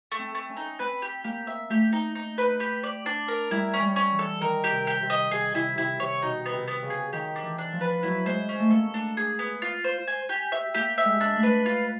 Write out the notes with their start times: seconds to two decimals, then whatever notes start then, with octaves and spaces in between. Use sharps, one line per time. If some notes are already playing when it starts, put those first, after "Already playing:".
0.12 A3
0.19 C4
0.35 A3
0.49 C#4
0.57 D#4
0.79 C4 B4
1.02 G4
1.24 A#3 G4
1.47 E5
1.70 A3 G4
1.93 D#4
2.15 D#4
2.38 B4
2.60 G4
2.83 D5
3.06 D4
3.28 A#4
3.51 G3 E4
3.74 C#4
3.81 G3
3.96 C#4
4.11 E3
4.19 A4
4.41 D#3 A#4
4.64 G4
4.71 C3
4.87 G4
5.02 C3
5.10 D#5
5.31 C3 G#4
5.54 C3 E4
5.77 C3 E4
5.99 C3 C#5
6.22 B2 D#4
6.45 B3
6.53 C3
6.68 B3
6.83 C#3
6.90 G#4
7.13 D#3 G4
7.36 D4
7.43 E3
7.58 D4
7.73 F3
7.81 B4
8.03 F#3 E4
8.25 G#3 C5
8.49 C#4
8.59 A3
8.71 A#3 A4
8.94 D4
9.17 G#4
9.39 B3
9.62 F4
9.84 C5
10.08 G#5
10.29 G4
10.52 E5
10.74 A#3 G4
10.98 E5
11.05 G#3
11.21 D4
11.35 A3
11.43 B4
11.66 F4